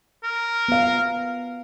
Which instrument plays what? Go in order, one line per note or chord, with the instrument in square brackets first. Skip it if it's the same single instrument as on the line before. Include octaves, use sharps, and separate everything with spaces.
[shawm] A#4
[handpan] B3 F5